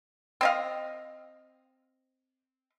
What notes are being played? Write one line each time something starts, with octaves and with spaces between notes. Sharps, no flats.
C4 D#5 F5